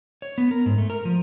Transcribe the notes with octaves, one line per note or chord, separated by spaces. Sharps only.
C#5
B3
A#4
G#2
A3
A#4
F3